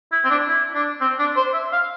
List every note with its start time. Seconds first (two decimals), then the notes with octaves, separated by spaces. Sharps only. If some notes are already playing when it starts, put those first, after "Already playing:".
0.12 E4
0.24 C4
0.30 D4
0.48 E4
0.74 D4
1.01 C4
1.19 D4
1.36 C5
1.54 E5
1.72 F5